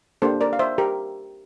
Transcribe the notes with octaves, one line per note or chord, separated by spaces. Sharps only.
A#3 D4 G4 A4 C5
A#4 D5
F5
C5 E5
G4 A#4